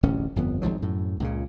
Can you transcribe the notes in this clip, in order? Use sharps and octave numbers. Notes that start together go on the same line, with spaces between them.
D1 A1 F2 C#4
G1 F2 D3 B3
G#1 G#2 F3 F#3
F#2 A2
C#2 A#2 C#3